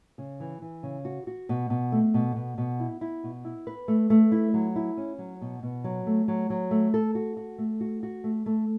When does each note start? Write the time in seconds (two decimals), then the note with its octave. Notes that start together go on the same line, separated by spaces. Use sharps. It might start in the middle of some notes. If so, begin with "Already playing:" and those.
0.18 C#3
0.40 E3
0.62 E3
0.83 C#3
1.05 F#4
1.27 F#4
1.49 B2
1.70 B2
1.92 A3
2.14 B2
2.36 B2
2.58 B2
2.80 E4
3.01 E4
3.24 B2
3.45 E4
3.67 B4
3.88 A3
4.10 A3
4.32 E4
4.54 F#3
4.76 E4
4.97 C#4
5.18 F#3
5.41 B2
5.63 B2
5.84 F#3
6.07 A3
6.28 F#3
6.50 F#3
6.71 A3
6.94 A4
7.15 F#4
7.37 F#4
7.58 A3
7.80 F#4
8.03 F#4
8.24 A3
8.46 A3